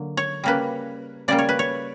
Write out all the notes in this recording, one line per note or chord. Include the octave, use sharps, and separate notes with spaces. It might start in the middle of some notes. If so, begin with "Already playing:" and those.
Already playing: D3 F#3 A#3
C#5
C#3 G3 A#3 B4
C#3 G3 A#3 D5
C#5
B4
C#5